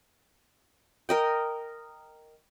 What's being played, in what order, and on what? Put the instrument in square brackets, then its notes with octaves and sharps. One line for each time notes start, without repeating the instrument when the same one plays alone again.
[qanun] A#4 D#5 G5